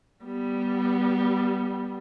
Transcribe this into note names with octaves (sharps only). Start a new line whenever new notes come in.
G3 B3